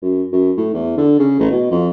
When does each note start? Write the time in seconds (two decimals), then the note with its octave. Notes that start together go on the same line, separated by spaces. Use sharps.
0.02 F#2
0.33 F#2
0.57 A2
0.74 E2
0.97 D3
1.19 C#3
1.39 A1
1.51 B2
1.71 F2